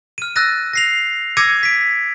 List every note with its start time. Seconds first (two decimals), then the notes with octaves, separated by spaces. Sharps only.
0.18 F6 D#7
0.36 E6 F#6 A6 A#6 D#7
0.73 A#6 C7 F7
1.37 D6 E6 G#6 A#6 C#7 D#7
1.63 B6 D7